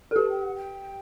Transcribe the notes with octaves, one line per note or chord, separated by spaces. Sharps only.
A4
G4 A5
G5
F#5
G5